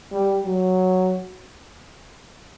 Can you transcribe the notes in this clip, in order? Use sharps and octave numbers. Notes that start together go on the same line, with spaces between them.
G3
F#3